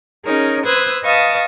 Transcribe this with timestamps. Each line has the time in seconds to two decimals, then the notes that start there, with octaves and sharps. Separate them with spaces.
0.24 C#4 D#4 G#4 A#4 C#5
0.64 B4 C5 D#6 E6 F#6 G#6
1.03 B4 D#5 F5 A5 C#6 D#6